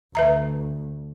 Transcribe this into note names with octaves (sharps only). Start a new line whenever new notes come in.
D2 B4 E5 A#5